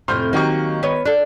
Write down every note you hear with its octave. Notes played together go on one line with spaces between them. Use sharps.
F2 A2 C3 C6 F6 G6
D#3 F#3 A#3 G4 C#6
B3 C#5
D4 A4